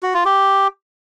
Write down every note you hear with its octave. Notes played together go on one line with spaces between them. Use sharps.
F#4
F4
G4